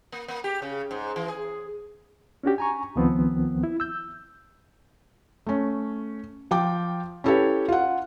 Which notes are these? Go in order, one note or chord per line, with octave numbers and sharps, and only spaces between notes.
A#3
A#3
G4
C#3
G#2
E3
G#4
C#4 D4 F#4 G4
G#5 A#5 C#6
C#2 D#3 F3 B3 C4
E4
E6 G6
A3 C#4
F3 G5 D6
C#4 E4 G4 A4 B4 C#5
F4 F#5